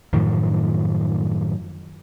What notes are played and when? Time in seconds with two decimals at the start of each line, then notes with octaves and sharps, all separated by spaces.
0.13 F#2 A2 D#3 F3